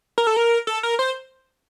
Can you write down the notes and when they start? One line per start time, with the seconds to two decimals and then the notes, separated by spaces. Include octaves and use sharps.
0.18 A#4
0.27 A4
0.37 A#4
0.67 A4
0.83 A#4
0.99 C5